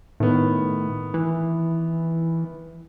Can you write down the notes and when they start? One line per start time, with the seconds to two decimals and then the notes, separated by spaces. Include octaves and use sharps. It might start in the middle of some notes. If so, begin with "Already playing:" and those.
0.20 A2 D#3 B3
1.14 E3